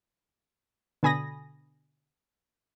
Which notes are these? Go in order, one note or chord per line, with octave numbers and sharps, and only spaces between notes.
B2 D3 G#5 B5 D#6 A#6